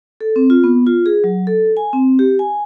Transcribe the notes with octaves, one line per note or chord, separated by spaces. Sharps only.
A4
C4
F4
B3
F4
G#4
F#3
A4
G#5
C4
G4
G#5